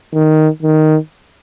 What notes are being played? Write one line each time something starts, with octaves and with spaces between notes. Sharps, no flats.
D#3
D#3